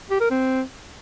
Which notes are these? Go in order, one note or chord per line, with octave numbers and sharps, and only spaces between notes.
G4
A#4
C4